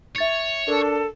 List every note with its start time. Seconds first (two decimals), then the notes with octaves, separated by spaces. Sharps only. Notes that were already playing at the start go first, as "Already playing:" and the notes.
0.16 C#5 E5 A6 C#7
0.68 D4 A4 A#4